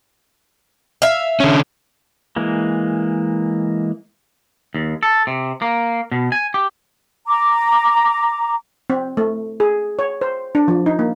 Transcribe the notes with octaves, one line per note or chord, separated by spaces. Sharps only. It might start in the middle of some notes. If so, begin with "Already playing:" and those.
E5 F5
D3 C#4
E3 G#3 A#3
D#2
A4
C3
A#3
B2
G#5
G4
A#5 D6
C4
A3
G#4
C#5
C5
D4
F3
D#4
A#3